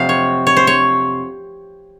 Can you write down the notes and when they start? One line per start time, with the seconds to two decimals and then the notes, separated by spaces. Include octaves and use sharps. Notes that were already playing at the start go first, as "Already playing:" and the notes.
Already playing: F2 C3 F#3 C4 F5
0.09 C#5
0.47 C#5
0.56 C5
0.67 C#5